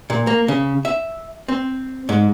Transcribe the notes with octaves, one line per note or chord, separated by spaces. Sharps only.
A#2
A#3
C#3
E5
C4
G#2